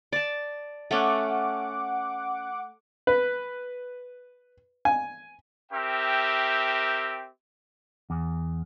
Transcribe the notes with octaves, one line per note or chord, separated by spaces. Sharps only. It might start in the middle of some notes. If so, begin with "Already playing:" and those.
D5 A5
A3 C#4 F#5 D6
B4
G#5
C4 G4 A#4 E5 G5
E2